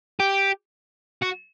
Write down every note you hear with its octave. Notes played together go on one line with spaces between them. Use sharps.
G4
F#4